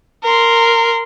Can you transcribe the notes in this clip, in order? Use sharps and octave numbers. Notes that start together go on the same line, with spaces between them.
A#4 C6